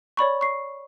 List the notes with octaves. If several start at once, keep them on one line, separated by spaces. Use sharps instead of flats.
C#5 D5 B5 C#6
C#6 C7